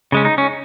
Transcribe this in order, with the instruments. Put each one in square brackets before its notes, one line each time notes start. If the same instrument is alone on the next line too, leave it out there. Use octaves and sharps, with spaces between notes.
[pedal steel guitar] C#3 G#3 C#4
D#4
C#4